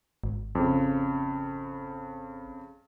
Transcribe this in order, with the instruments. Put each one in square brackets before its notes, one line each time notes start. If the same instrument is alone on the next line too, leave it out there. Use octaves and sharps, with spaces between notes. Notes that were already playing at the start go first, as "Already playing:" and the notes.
[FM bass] G#1
[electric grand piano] F2 C#3